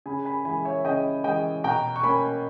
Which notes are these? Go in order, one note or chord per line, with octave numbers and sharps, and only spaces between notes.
C#3 G#5 B5
G#5 B5
E3 G#3 G#5 B5
C#5 E5
C#3 D#5 G5
E3 G#3 D#5 G5
B2 G5 A#5
C#6
A#3 C#4 G#5 B5